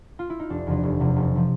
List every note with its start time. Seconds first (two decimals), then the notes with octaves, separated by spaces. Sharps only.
0.19 F4
0.30 E4
0.40 D#4
0.50 F1 D4
0.67 E2 C3 F3
0.83 F1
1.00 E2 C3 F3
1.16 F1
1.35 C3 F3